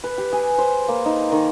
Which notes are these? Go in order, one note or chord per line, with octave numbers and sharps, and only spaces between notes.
B4
G4
G#4
C5
A#3
D#4
D#3